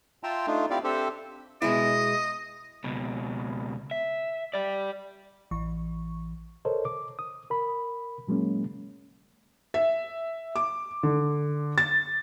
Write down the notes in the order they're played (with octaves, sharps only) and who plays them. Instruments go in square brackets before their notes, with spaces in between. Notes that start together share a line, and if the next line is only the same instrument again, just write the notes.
[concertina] F4 E5 G5 A5 A#5 C6
A3 D4 D#4 F4
C4 E4 F4 G4 D5 F5
C4 D4 G4 A4 C5 E5
[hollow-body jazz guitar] B2 G#3 E4 [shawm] D#5
[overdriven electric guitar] C#2 B2
E5
G4 D5
[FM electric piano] A1 E3 C#6
[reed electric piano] A4 A#4 C5 C#5 D#5
D6
D#6
A#4 B5
A#2 F#3 G#3 A#3 C#4
[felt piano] E5
D6
D3
A6